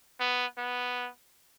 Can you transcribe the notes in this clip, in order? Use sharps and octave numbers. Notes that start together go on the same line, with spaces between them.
B3
B3